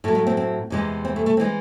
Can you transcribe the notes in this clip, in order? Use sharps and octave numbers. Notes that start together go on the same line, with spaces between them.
A2 F#3 A3
A3
C4
C4
E2 C3 E3 G#3
C4
A3
A3
C4
E3 G#3